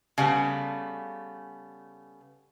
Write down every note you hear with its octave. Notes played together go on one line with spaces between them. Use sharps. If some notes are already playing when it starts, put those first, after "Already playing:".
C#3 G3 A3 B3